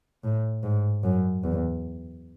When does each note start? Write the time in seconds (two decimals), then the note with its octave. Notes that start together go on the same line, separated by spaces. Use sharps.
0.24 A2
0.63 G#2
1.04 F#2
1.44 E2